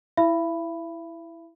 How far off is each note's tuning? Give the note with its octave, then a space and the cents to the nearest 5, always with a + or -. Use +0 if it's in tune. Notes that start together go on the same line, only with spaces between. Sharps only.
E4 +0 E5 +40 B5 +0